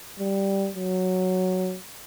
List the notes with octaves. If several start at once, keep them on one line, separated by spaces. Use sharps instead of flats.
G3
F#3